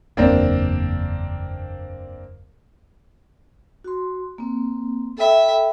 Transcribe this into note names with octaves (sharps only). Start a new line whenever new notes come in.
F#1 E2 F#3 A#3 C4 D4
F#4 C6
A#3 C4
A4 E5 G5 B5